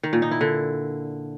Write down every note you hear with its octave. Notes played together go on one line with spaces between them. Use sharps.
D#3
A#2
D#4
E4
D3